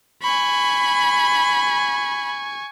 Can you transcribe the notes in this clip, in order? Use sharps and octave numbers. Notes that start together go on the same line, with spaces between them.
G#5 B5 C#6